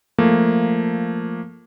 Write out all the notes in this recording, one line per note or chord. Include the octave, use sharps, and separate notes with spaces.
F3 A3 A#3